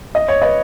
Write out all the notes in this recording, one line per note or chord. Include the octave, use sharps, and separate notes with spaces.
D#5
C#5
B4 D#5